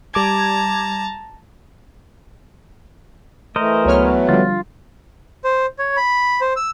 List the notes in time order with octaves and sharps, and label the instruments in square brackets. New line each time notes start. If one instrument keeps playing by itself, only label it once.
[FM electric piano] G3 D6 G#6 [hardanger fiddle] A5 A#5
[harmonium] E3 A3 [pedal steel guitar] A#4 C5 D#5
[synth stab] C#2 C#5 F6 [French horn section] F#3 B3
[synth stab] D3 F3 G3 [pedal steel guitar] F4
[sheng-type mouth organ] C5
C#5
B5
C5
E6